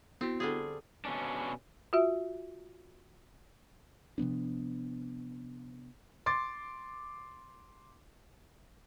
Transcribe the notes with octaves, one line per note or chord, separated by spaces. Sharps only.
B3 C4 E4 F#4
D3 G3 G#4
B2 C#4 D4
F4 F#4 E5
C3 F3 B3 D4
C6 D6 A6